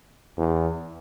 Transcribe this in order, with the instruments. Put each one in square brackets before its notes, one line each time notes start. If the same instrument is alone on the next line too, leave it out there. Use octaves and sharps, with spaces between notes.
[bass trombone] E2